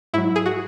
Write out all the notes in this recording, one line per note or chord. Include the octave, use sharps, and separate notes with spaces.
G#2 F#3 E4
G#4
F#4